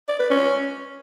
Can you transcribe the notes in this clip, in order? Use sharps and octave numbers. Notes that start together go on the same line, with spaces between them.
D5
B4
C#4